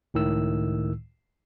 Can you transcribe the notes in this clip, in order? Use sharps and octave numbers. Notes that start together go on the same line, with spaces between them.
C#2 A2 D#3 E6